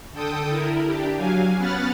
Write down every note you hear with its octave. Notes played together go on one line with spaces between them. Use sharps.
D3 A4 G5 D#6
E4 A#4
D4 G4
F#3 F5 G#5
B3 C#4 F#5 B5 F6 A6